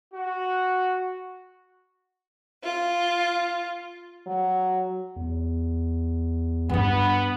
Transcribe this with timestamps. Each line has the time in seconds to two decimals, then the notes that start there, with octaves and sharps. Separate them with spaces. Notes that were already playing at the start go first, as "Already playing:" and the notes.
0.14 F#4
2.63 F4
4.27 F#3
5.16 E2
6.69 G2 B3 D4